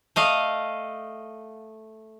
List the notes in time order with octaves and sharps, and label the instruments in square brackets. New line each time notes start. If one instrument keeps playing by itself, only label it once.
[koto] A3 D#5 F5